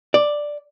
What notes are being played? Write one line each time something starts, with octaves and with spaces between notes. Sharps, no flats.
D5